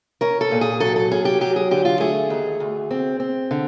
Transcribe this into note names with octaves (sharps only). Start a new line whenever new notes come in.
C#4 A#4
A4
A#2
G#4
F#3 A4
A4
C#4 G#4
G4
F#3 G4
G#4
D3 G4
F4
A3 G#4
D#2
D2
C4
C4
D3